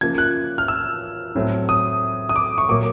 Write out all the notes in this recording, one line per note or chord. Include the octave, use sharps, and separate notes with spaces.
C#3 F3 A#3 G#6
F#6
F6
E6
A2 F#3 A3 C4
D#6
D#6
D6
C#6
A#2 F#3 A#3 D6